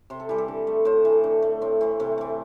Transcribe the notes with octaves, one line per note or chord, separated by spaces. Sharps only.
C3 C5
A4
E3 G3 G4
A4
D3
A3
A2 C5
E3 A3
D3
A3
A2 C4
E3 A3 C4
C3 A3
E3 A3